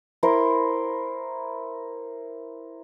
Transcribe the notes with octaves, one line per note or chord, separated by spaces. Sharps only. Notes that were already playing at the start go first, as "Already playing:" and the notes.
E4 A#4 C5